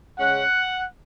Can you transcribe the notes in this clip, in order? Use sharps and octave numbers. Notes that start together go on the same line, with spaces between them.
C#3 G#3 C#4 F#5